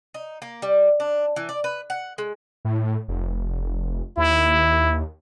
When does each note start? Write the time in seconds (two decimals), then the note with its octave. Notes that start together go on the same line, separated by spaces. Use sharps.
0.14 D#4
0.42 A#3
0.62 G3
1.00 D4
1.36 E3
1.49 D5
1.64 B4
1.90 F#5
2.18 G#3
2.65 A2
3.08 F1
4.17 D#2 E4